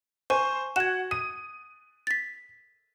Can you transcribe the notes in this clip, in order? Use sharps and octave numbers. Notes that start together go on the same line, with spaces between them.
C5 G#5 C#6
F#4 F#5 G#6 E7
D#6 D#7
A6 B6